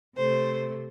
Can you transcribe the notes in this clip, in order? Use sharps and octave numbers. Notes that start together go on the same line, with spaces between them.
C3 A3 C5